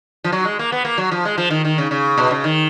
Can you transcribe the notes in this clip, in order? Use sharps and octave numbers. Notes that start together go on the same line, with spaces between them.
F3
F#3
G#3
A#3
B3
A#3
F#3
F3
G#3
F3
D#3
D#3
C#3
C#3
B2
C#3
D#3